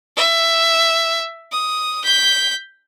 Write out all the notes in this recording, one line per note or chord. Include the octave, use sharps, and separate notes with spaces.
E5
D#6
G6 B6